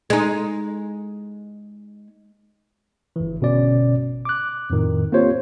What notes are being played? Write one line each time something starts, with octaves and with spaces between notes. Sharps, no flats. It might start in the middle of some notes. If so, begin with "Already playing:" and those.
G#3 D#4
G1 E3
G1 B2 C#4 D5
D6 F#6
F2 A2 D#3
A#3 C4 F4 G4 C5 C#5